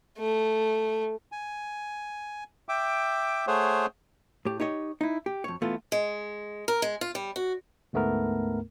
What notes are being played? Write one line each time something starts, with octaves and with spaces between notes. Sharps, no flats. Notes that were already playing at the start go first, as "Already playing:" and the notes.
A3
G#5
E5 G5 D6
A3 G#4 C5 C#5 F#5
A2 G4
D#4 G4 C#5 D#5
D#4 E4
G4
F2 C#5
E3 A3 B3 F4
G#3
A#4
G#3
F4
G3
F#4
D2 G#2 A3 B3 A#4